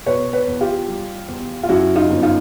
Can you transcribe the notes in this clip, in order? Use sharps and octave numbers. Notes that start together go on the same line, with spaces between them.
B2 B4 C#5
B4 C#5
E2
F4 G4
G3
E2
F4
F#2 E4 F#4
D#4 F4
G1
D#4 F4